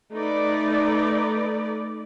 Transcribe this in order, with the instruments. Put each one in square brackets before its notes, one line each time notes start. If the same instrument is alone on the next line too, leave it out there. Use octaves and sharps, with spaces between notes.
[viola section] A3 D#4 B4 D5